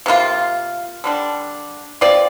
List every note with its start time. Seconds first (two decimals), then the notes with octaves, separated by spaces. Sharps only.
0.06 C3 A#3 F4
1.04 D3 G3 D4
2.01 C4 F4 D5